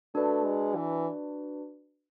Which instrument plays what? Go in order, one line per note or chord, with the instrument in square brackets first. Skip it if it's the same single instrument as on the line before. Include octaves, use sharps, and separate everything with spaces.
[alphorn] A3 [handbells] D4 F#4 B4 D5
[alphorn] G#3
E3